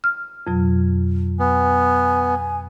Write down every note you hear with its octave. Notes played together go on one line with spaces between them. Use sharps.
F6
F2 B2 F#3
B3 G#5